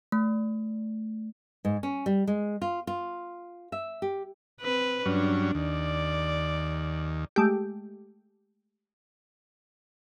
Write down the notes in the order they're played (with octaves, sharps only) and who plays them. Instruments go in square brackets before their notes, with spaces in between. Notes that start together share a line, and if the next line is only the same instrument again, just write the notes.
[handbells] A3
[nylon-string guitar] G#2
C#4
G3
G#3
F4
F4
E5
G4
[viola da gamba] C4 B4
[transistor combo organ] G2 F#3 C#4 [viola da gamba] D4
[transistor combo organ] D#2 [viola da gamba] D5
[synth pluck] G#3 A3 G4